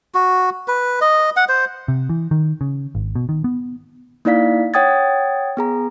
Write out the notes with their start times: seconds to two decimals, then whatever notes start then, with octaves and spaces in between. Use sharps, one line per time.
0.14 F#4
0.68 B4
1.01 D#5
1.36 F#5
1.49 C5
1.88 C3
2.09 E3
2.31 D#3
2.61 C#3
2.95 G#1
3.15 B2
3.29 D#3
3.44 B3
4.25 A#3 D#4 E4 D5 F5 B6
4.74 C#5 F#5 G5 D#6 G#6 A6
5.57 B3 G#4 A#5